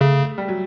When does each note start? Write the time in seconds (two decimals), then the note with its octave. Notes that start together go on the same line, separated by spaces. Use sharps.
0.01 C#3 A3
0.38 G3
0.48 F#3